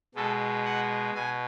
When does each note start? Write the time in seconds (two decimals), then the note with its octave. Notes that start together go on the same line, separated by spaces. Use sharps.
0.15 B2 G#3 A4
0.65 F#5
1.14 B2 G#5